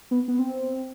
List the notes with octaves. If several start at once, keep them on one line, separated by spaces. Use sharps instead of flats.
B3
B3
C4